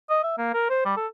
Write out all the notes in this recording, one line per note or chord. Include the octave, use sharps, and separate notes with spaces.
D#5
E5
A#3
A#4
C5
G3
A4